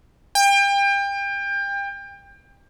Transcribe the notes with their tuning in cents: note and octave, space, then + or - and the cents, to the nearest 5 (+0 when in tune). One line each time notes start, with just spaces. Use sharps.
G5 +30